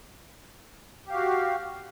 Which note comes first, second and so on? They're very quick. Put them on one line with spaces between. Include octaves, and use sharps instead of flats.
G4 F5 F#4